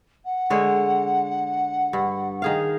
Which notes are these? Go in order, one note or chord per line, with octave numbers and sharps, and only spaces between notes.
F#5
D3 G#3 C#5
G2
D#3 G#4 F5